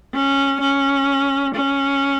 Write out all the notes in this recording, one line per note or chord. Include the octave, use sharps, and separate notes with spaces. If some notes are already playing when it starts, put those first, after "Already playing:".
C#4
C#4
C#4